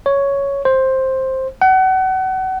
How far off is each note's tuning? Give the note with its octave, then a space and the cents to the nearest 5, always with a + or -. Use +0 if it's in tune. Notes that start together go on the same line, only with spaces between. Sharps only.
C#5 +5
C5 +10
F#5 +30